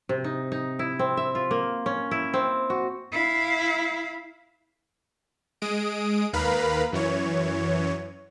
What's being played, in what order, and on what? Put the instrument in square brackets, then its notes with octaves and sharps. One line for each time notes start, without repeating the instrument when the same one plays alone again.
[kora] C3
D#4
D#4
E4
C4
E5
F4
A#3
C#4
E4
C4
F#4
[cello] E4 F5
[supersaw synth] G#3 D#6 D7
D#2 A#4 B4 F5 B5
F#2 E3 C#5